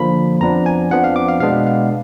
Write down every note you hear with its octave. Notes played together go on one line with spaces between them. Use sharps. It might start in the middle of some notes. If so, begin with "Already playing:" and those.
Already playing: D3 F3 A#3 D4 B5
F2 F3 B3 D4 A#5
G#5
F2 F3 B3 D4 F#5
F5
D6
F5
B2 G#3 B3 D4 F5
F5